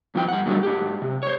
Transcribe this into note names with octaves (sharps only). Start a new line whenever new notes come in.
F2 F3 E4 G5
G2 F#5
A2 D3 F#3 G3 A3
G#2 G4
C3
C5 C#5